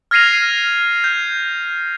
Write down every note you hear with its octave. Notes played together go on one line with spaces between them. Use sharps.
F6 G#6 A#6 C7 D#7 F7
G6